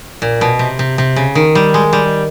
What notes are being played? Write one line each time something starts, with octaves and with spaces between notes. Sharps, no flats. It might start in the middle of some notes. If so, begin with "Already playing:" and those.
A#2
B2
C3
C3
C3
C#3
D#3
G3
G#3
G3